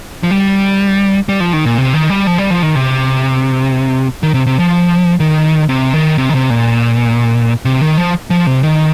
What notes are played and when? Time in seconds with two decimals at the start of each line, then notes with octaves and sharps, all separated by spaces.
0.23 F3
0.31 G3
1.29 G3
1.40 F3
1.53 D#3
1.65 A#2
1.78 C3
1.94 D#3
2.10 G3
2.27 F3
2.38 G3
2.50 F3
2.62 D#3
2.75 C3
4.23 D#3
4.34 C3
4.47 C3
4.59 F3
5.20 D#3
5.69 C3
5.94 D#3
6.18 C3
6.29 D#3
6.35 C3
6.50 A#2
7.65 C3
7.81 D#3
7.98 F3
8.30 F3
8.47 C3
8.63 D#3